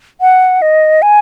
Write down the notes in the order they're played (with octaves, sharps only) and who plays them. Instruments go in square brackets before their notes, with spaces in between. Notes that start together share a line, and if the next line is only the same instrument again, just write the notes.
[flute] F#5
D#5
G#5